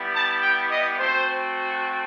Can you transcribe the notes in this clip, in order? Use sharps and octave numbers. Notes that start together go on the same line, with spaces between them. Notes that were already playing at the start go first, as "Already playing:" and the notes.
Already playing: G3 B3 E4 G4
A5
G5
D#5
A3 C4 F#4 C5